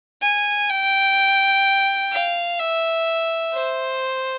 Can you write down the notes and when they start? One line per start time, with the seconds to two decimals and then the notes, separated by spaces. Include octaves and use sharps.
0.22 G#5
0.69 G5
2.12 F5
2.59 E5
3.53 C5